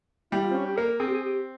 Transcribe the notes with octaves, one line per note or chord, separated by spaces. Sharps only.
G3 E4
F4
C4
C#4
G4
A#3 A#4
C4 G#4
G4
G#4
G4